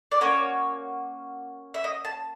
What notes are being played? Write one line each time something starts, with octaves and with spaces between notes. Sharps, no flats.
D5
A#3 C#4 F#4 C#5
E5
D#5
A5